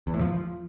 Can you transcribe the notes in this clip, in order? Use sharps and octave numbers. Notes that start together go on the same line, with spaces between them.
E2
A2
F3